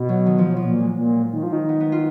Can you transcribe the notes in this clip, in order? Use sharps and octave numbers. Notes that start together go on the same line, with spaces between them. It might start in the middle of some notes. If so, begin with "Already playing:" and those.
Already playing: B2
F#3
D#3
F3
F#3
F3
A#2 F#3
G#3
A#2
D#3
F3
D#3
B3
B3
F4